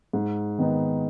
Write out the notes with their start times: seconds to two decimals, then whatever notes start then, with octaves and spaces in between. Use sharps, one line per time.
0.13 G#2
0.58 D#3 B3 D#4